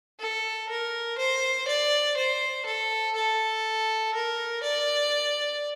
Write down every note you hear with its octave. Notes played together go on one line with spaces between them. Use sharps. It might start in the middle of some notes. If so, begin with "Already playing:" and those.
A4
A#4
C5
D5
C5
A4
A4
A#4
D5